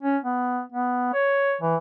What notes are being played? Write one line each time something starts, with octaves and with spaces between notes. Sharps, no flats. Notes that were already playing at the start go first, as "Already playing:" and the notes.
C#4
B3
B3
C#5
E3